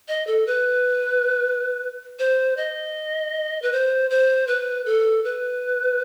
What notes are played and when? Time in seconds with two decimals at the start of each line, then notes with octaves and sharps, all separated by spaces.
0.08 D#5
0.27 A4
0.47 B4
2.19 C5
2.57 D#5
3.62 B4
3.72 C5
4.10 C5
4.48 B4
4.86 A4
5.24 B4